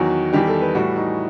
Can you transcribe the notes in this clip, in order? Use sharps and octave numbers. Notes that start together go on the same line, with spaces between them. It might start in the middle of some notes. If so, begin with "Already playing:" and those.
Already playing: E2 D#3 F#3 F#4
E2 D#3 G3 G4
A4
B4
A2 E3 G3 F#4
D#4